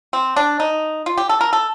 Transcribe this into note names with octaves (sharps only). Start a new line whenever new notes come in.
C4
D4
D#4
F4
G4
A4
A#4
A4